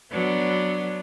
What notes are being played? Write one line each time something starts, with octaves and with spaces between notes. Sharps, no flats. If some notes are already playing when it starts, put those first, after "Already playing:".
F#3 B3 D4